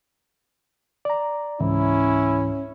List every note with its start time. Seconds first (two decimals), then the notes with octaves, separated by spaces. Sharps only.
1.05 D5 A#5
1.60 C#2 G#2 E3 C#4 E4